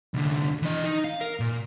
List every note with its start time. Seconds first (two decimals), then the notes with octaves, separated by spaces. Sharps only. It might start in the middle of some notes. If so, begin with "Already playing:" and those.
0.14 C2 D3
0.62 E3 D#5
0.84 D#4
1.04 F5
1.21 A#4
1.40 A#2